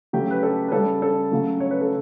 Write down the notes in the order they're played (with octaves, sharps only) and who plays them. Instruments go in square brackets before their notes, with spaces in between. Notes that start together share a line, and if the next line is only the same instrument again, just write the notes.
[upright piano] C#3 F#3 A3 G4
B4
A4
B4
C#3 G3 A4
A4
C#3 F#3 A3
C#5
B4
A4